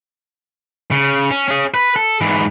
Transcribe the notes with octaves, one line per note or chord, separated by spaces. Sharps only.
C#3
C#4
C#4 G#4
B4
A4
G#2 E3